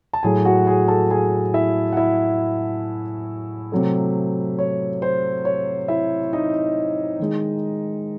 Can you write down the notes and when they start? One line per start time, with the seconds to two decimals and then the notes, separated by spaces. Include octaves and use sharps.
0.13 A5
0.23 A2 F#3 A3 G#4 G#5
0.45 F#4 F#5
0.67 G#4 G#5
0.88 A4 A5
1.10 G#4 G#5
1.54 E4 E5
1.93 F#5
1.97 E4 E5
3.72 C3 F#3 A3
4.59 C#5
5.02 C5
5.45 C#5
5.88 E4 E5
6.33 D#4 D#5
7.20 D#3 G#3